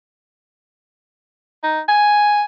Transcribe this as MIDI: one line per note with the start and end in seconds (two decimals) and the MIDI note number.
1.63 1.80 63
1.88 2.44 80